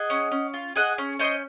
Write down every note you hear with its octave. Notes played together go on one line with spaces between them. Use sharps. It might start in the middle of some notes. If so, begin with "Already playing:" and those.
Already playing: G#4 D#5 F#5
C#4
C#4
F4
G#4 D#5 F#5
C#4
C#4 C5 D#5